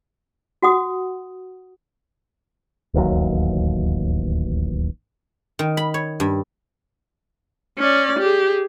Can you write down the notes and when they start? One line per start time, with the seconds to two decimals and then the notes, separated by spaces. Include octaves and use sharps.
0.62 F#4 F#5 D#6
2.94 D1 A1 D#2 F#3
5.59 D#3
5.77 B5
5.94 C#5
6.20 G2
7.79 C#4 D5
8.19 G4 G#4